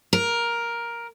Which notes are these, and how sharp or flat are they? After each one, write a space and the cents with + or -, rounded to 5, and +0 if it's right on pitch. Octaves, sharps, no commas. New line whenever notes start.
A#4 +10